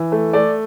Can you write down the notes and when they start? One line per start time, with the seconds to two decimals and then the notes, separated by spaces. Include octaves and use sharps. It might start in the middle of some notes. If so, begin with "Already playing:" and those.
Already playing: E3
0.12 A3
0.33 A3 D5